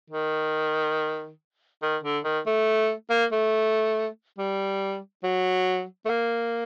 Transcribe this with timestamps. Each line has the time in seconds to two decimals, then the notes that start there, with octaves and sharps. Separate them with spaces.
0.10 D#3
1.82 D#3
2.03 D3
2.24 D#3
2.46 A3
3.10 A#3
3.32 A3
4.38 G3
5.23 F#3
6.05 A3
6.09 A#3